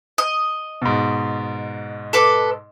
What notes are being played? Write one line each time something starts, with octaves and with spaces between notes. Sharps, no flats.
D#5
G#2 B2
A4 B4 D6